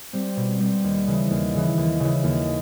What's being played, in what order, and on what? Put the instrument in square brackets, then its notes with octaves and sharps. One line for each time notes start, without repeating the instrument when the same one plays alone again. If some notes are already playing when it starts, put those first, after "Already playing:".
[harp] G3 C4
B2
G3 C4
D#2
C#3 E3
D#2
C#3 E3
D#2
C#3 E3
D#2